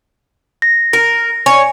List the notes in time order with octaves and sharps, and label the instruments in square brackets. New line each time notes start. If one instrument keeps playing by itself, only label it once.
[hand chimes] A#6
[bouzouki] A#4 [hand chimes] A#6
[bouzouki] C#5 [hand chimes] G#5